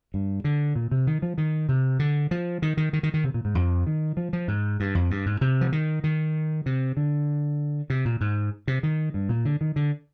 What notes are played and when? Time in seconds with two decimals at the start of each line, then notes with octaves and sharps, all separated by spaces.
0.14 G2
0.44 D3
0.76 A#2
0.91 C3
1.07 D#3
1.22 F3
1.38 D#3
1.69 C3
1.99 D3
2.31 F3
2.62 D#3
2.77 D#3
2.93 D#3
3.03 D#3
3.14 D#3
3.24 C3
3.34 A#2
3.45 G#2
3.55 F2
3.87 D#3
4.17 F3
4.33 F3
4.48 G#2
4.80 G2
4.95 F2
5.11 G2
5.26 G#2
5.41 C3
5.61 F3
5.72 D#3
6.04 D#3
6.66 C3
6.97 D3
7.90 C3
8.05 A#2
8.21 G#2
8.68 C3
8.83 D#3
9.14 G2
9.29 A#2
9.45 D3
9.61 D#3
9.76 D3